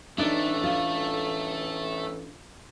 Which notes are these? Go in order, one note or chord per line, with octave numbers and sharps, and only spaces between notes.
A1 A3 D4 D#4 D5 E5
F4